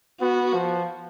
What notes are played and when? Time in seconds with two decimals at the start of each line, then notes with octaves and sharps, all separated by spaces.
0.20 B3 F#4
0.54 F3